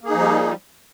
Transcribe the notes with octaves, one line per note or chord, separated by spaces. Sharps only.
F3 G3 A#3 D#4 G#4